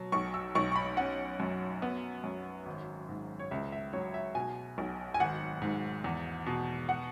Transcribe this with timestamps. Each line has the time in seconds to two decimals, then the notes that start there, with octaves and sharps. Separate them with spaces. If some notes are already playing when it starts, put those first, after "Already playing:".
Already playing: B2 F#3
0.12 B1 C#6
0.34 E6
0.55 B1 C#6
0.72 C#6
0.76 B5
0.97 C#4 F#5
1.40 F#2
1.82 B3
2.24 F#2
2.66 G#1
3.09 G#2
3.39 C#5
3.51 C#2 E5
3.72 E5
3.93 F#3 C#5
4.14 E5
4.35 B2 G#5
4.78 B1
5.14 G#5
5.20 G#1 F#5
5.62 G#2
6.04 E2
6.46 B2
6.89 F#5